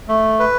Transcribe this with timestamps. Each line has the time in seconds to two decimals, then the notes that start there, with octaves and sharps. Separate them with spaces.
0.09 A3
0.39 B4